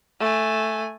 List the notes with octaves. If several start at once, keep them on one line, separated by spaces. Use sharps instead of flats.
A3 G#5